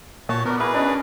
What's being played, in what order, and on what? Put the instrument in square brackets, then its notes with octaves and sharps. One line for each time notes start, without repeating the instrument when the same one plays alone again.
[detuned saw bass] A#2 [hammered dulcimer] F#4 [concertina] C#5 A5
[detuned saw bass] B3 [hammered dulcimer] F#4 D5 [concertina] A#4
[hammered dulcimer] E4 A#4 [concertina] G#4 B4
[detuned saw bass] C#4 [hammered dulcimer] D4 D5 D#5